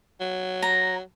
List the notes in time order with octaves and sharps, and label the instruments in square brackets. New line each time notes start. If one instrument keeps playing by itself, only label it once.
[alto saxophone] F#3
[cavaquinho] A#5